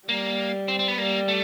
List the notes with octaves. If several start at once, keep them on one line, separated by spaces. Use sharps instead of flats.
G3 A#3
C4
C4
B3
G3 A#3
A3